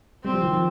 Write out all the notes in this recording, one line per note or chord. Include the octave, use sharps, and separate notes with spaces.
G3 C4
F3
D#3
F3